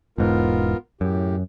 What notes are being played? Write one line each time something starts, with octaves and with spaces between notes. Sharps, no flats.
E1 G#2 B3 F4 A#4
F#2 A2 G4